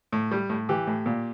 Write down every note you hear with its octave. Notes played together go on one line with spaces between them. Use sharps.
A2
G3
A2
E3 G4
A2
A#2